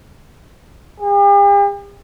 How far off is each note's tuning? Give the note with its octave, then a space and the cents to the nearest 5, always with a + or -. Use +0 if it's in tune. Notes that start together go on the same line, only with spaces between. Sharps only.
G4 +45